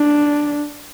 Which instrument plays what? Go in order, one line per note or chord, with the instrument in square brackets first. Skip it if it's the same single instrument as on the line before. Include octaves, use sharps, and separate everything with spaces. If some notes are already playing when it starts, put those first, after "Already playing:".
Already playing: [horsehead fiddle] D4